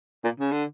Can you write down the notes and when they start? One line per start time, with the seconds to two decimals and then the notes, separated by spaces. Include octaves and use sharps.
0.24 A#2
0.40 C#3
0.52 D3